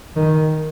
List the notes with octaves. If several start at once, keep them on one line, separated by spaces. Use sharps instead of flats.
D#3